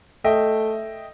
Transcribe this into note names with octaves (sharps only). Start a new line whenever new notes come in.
A3 D#5 E5 G5